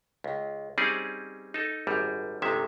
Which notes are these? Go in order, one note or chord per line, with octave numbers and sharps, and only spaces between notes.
C#2
G3 C4 C#4 D#4 G#4 D5
D#4 A4
G#1 F#2 G3
G1 C3 D#3 G#3 E5